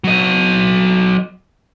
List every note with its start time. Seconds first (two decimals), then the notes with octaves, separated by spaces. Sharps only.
0.04 F#3 D#5